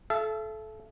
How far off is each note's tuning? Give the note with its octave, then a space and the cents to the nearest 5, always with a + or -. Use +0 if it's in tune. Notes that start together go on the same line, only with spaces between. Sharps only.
A4 -25 E5 +40